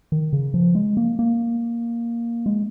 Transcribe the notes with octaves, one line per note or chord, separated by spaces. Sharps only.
D#3
C#3
F3
G#3
A#3
A#3
G#3